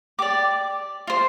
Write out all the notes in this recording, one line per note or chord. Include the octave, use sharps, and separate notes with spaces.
G4 D5 D6
F4 C5